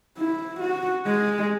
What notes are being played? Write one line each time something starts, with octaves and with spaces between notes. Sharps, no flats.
E4
F#4
G#3